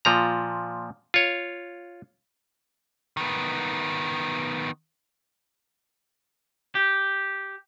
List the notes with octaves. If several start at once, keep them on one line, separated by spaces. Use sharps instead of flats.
A#2 F3 A#5
F4 C#5
D#3 B3
G4